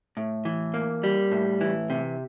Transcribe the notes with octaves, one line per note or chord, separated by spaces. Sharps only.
A2
E3
A#3
G3
A2
E3
C3